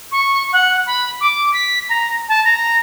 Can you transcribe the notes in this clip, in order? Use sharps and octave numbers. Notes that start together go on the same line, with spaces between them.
C#6
F#5
B5
D6
B6
A#5
A5
A#5